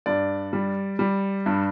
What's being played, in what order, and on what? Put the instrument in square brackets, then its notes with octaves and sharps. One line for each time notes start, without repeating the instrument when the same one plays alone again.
[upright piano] G2 D5
G3
G3
G2